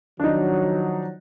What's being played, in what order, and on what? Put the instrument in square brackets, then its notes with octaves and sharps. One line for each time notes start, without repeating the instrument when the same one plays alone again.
[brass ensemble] D#3 F3 F#3 [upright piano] D4 D#4